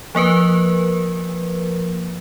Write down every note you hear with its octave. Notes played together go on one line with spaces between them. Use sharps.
F3 A#3 A#4 B4